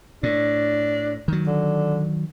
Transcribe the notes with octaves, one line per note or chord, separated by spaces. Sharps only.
A2 D4
D#3 F#3
D3